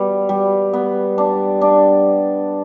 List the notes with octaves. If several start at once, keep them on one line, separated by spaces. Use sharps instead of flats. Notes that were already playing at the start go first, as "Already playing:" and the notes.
Already playing: G3 B3
G3
B3
D4
D4